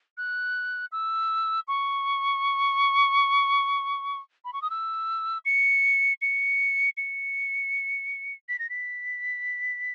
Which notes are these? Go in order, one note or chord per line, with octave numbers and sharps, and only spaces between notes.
F#6
E6
C#6
B5
C#6
D#6
E6
C#7
C#7
C#7
B6
A#6
B6